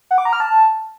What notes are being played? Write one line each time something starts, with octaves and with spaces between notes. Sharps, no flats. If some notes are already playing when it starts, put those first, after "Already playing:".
F#5
D6
A#5
F6
A5